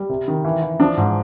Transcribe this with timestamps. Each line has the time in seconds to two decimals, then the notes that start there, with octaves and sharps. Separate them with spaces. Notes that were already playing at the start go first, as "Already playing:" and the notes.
Already playing: G3
0.09 C3
0.28 D#3
0.45 E3
0.62 E3
0.80 F3 D4
0.97 G#2